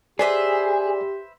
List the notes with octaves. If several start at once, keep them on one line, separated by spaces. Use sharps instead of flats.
G4 G#4 B4 C5 D5 E5